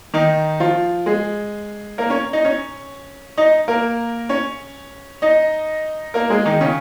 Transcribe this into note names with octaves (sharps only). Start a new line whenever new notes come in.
D#3 D#4
F3 F4
G#3 G#4
A#3 A#4
C#4 C#5
D#4 D#5
C#4 C#5
D#4 D#5
A#3 A#4
C#4 C#5
D#4 D#5
A#3 A#4
G#3 G#4
D#3 D#4
C#3 C#4